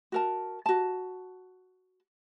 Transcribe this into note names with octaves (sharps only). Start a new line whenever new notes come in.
F#4 A#4 A5
F#4 A5